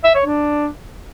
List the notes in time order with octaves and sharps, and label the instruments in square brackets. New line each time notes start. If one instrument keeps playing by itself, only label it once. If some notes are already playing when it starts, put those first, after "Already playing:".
[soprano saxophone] E5
C#5
D4